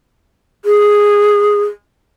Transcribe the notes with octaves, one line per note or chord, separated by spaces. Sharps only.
G#4